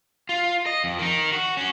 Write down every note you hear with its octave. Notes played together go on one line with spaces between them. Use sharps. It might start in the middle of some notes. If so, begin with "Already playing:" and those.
F4
D#5
F2
D#3 D#4
F#4
C#4 F#4